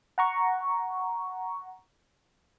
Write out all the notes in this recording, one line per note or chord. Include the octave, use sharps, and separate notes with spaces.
F#5 A#5 C#6